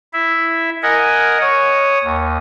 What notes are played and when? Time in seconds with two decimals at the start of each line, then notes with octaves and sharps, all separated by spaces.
0.13 E4 E5
0.83 A#4 D#5 F#5 G#5
1.41 C#5 D#6
2.04 D#2